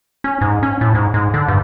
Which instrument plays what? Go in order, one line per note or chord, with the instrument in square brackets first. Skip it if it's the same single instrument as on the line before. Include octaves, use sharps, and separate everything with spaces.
[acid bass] C#4
G#2
C#4
A2
G#2
G#2
D3
G2